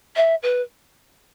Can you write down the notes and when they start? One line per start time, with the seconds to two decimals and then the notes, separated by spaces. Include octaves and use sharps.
0.16 E5
0.43 B4